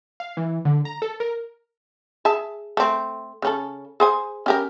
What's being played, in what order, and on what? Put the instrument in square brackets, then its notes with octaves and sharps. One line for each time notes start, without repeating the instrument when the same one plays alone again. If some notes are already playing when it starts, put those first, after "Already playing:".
[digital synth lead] F5
E3
D3
A#5
A4
A#4
[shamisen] G#4 E5 A5
A3 C4
C#3 C#4 A4
G#4 C5 G#5
C#4 G4 A#4